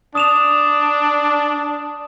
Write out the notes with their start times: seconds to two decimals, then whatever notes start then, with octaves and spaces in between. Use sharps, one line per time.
0.15 D4 D#6 E7 F7